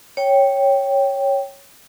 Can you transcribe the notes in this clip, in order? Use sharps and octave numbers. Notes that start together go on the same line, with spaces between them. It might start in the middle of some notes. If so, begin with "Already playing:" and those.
C#5 G5